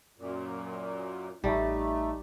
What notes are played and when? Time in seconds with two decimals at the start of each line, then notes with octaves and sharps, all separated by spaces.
0.18 F#2 A#2
1.44 A1 G3 A3 D#4 A5